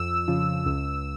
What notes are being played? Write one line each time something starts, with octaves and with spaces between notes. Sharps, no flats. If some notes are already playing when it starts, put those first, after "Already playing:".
Already playing: F2 E6
C#3 F3
C#2